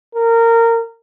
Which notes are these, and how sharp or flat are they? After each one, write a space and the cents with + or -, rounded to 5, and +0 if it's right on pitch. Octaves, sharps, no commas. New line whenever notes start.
A#4 -20